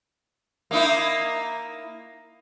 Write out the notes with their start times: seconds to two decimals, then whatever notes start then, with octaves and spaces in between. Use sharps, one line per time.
0.71 A#3 D#4 E4